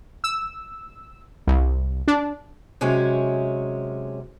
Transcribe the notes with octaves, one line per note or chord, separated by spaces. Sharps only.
E6
C2
D4
C3 F#3 G#3 C#4